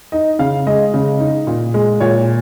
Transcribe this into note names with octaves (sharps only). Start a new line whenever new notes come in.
D#4 D#5
C#3 F5
G#3 D#5
C#3
D#4
A#2
G#3
A#2 C#5